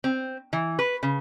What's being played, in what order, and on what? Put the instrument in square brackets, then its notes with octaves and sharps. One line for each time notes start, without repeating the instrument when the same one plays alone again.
[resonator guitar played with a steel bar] C4
E3
B4
C#3